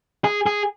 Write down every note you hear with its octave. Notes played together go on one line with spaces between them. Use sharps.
G#4
G#4